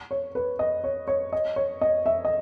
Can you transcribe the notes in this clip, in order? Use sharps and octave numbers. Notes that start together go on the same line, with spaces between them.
C#5
B4
D#5
C#5
C#5
D#5
C#5
D#5
E5
D#5